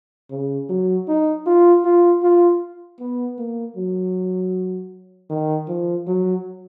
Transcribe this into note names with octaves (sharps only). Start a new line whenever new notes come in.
C#3
F#3
D#4
F4
F4
F4
B3
A#3
F#3
D#3
F3
F#3